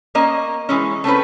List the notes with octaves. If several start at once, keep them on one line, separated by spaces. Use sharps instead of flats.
A#3 C#4 D#5
E3 G#3 C#4
A3 C4 C#4 B4